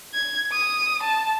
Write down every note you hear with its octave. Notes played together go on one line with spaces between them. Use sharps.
G#6
D#6
A5